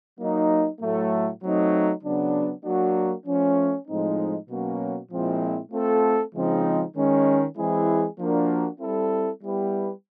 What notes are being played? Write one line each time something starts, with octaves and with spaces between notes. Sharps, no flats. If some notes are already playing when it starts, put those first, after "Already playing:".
F#3 A#3 D#4
A2 F#3 A3
F#3 A3 C4 D#4
C#3 F#3 B3 D4
F#3 A#3 D4 F#4
F3 A3 C#4
A2 F3 G#3 C4 D#4
B2 F#3 A#3 C#4 F#4
A#2 F3 G#3 C4 E4
A3 C4 F4 A4
C#3 F3 G#3 C4 D#4
D#3 G#3 C#4
E3 G#3 C4 E4 G#4
F3 A#3 D4 F#4 A#4
G3 C4 E4 A4
G3 B3 E4 G4 B4